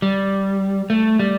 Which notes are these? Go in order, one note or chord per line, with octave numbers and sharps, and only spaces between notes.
G3
A3
G3